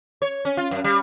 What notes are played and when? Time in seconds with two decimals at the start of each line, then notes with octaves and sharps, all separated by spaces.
0.22 C#5
0.45 C#4
0.57 F4
0.71 F#2
0.84 G3